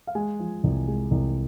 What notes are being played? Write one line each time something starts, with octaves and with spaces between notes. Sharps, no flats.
F5
G#3 G#5
F3
C2
G#3
C2